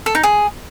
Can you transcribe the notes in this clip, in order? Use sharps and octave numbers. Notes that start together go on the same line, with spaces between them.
A4
D#4
G#4